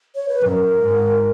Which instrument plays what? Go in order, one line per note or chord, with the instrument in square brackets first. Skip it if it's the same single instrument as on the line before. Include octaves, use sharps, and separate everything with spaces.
[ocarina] C#5
B4
[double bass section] F#2 [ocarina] A#4
[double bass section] G#2